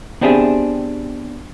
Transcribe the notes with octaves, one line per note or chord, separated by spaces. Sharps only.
B3 C4 D4 G4 G#4 E5